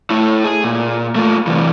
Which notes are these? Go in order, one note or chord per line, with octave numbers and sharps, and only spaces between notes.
A3 E4
G#4
A#2
A3 F4
C3 E3